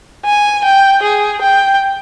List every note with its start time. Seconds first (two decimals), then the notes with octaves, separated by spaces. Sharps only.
0.25 G#5
0.64 G5
1.02 G#4
1.41 G5